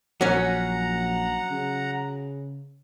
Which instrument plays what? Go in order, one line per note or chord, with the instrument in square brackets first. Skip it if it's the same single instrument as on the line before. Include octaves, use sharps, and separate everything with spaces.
[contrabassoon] A#1 [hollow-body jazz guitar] F#3 C#4 [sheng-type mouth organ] F#5 A#5
[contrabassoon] C#3